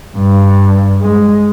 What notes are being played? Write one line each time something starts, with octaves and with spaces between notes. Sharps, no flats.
G2
G#3